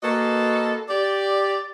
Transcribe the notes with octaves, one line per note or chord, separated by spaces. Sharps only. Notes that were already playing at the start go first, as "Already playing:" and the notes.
A#3 F#4 A4 B4 D#5
G4 D5